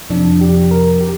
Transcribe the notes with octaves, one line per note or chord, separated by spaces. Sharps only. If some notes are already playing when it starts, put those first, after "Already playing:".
F2 C3 F3 D4
G4
A#4
G4